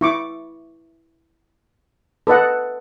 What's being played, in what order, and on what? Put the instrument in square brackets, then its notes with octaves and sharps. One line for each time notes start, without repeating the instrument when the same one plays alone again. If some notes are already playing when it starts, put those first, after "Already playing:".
[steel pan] E4 C#6 D6
A4 B4 D#5 F#5